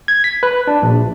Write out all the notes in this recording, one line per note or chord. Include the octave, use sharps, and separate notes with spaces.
G#6
B6
B4
D4
A#1